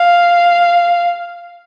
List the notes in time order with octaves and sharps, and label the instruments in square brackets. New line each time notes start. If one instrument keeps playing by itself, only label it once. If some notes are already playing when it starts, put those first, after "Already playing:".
Already playing: [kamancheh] F5